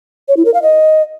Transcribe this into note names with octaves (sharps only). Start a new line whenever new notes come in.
C#5
E4
A#4
F5
D#5